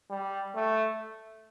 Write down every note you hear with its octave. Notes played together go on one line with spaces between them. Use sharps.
G3
A3